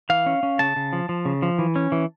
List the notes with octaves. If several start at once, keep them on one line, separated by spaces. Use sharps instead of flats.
E3 F5
C#4
C#4
C#3 A5
C#3
F3
F3
C#3
F3
E3
C#4
E3